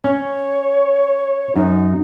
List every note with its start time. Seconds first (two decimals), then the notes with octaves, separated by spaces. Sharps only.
0.04 C#4 C#5
1.56 F#2 D#4